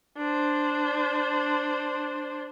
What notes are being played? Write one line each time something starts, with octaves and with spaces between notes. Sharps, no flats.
D4 C5